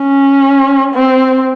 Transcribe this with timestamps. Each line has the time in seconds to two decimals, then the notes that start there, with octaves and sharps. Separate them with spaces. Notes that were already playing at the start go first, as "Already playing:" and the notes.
Already playing: C#4
0.94 C4